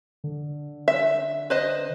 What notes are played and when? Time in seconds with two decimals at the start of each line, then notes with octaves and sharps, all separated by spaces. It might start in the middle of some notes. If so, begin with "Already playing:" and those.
0.24 D3
0.88 E5
1.50 B4 C5 D#5